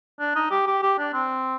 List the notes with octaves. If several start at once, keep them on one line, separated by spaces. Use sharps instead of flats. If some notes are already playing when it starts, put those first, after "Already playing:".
D4
D#4
G4
G4
G4
D4
C4